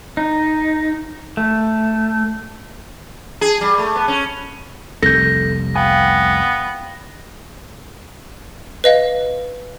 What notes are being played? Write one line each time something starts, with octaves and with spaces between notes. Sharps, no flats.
D#4
A3
G#4
G3
A3
B3
C#4
F1 C2 A4 G6 A#6
B3 F5 G5 G#5
B4 D#5 F5